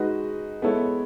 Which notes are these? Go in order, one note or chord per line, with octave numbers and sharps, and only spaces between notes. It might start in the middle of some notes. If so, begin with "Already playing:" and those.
Already playing: G#3 D#4 F#4 B4 D#5
G#3 B3 E4 A4 C#5